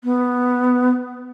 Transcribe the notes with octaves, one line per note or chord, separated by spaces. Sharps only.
B3